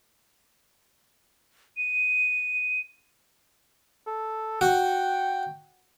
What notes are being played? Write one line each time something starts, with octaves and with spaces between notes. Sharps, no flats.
D#7
A4
F#4 G5